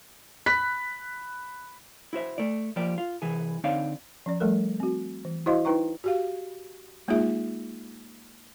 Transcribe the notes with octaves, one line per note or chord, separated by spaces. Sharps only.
B5 F#6 B6
E4 F#4 C5 E5
A3 D5
F3 G3 A#3 G4 D5
F4
C2 E3 G#4
D3 C4 D#4 C#5 D5 F5
F3 C#4 D5
F3 G3 A3 A4 A#4
C4 F#4
E3
E4 F#4 C5 D#5 F5 C6
D#4 E4 B4 G5 A#5 C#6
F#4 G4 F5
G#3 A#3 D#4 F4 G#4 E5